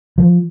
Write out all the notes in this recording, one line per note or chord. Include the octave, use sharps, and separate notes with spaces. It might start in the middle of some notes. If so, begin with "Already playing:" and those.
F3